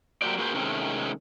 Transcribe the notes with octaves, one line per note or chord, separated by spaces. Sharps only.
F#3 A#3 F#4 G4 C5 D5
A#3 F#4 G#4 B4 C5
C3 D#3 G#3 A3 C4 C#4